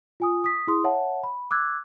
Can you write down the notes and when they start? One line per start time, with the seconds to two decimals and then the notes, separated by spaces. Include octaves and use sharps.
0.20 F4 G#5 D#6
0.44 D#6 B6
0.67 E4 G#4 C6 D#6
0.84 C#5 E5 F#5 A5
1.23 B5
1.51 D6 E6 F#6 G#6